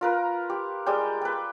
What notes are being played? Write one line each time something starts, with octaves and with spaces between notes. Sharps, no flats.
F4 A#4 B4
G4
G3 G#3 G5
B4 G5